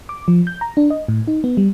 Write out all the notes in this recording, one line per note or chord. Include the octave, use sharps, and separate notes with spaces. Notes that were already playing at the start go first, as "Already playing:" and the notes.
D6
F3
G6
A#5
D4
D#5
A2
D#4
B3
G3